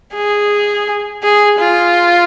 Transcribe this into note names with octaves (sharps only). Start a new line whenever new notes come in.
G#4
G#4
F4